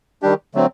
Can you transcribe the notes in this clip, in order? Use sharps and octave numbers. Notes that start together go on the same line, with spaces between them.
D#3 G3 D4 G4
D3 F#3 A3 C4